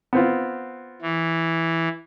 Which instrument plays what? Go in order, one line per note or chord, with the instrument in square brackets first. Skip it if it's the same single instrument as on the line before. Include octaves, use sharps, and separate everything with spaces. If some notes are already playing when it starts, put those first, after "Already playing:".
[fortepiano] B3 C4 F4
[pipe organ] E3